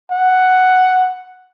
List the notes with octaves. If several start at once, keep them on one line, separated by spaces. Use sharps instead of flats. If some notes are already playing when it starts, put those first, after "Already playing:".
F#5